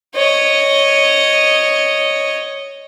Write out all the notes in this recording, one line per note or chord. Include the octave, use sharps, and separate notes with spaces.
C#5 D#5